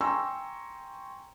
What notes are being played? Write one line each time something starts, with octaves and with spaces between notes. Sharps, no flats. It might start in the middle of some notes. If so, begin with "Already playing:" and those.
G5 G#5 A#5 C6 C#6 E6